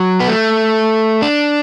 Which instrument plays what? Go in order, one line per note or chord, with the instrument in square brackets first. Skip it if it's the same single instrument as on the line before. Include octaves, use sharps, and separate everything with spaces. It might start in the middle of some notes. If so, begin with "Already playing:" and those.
Already playing: [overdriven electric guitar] F#3
B3
A3
D4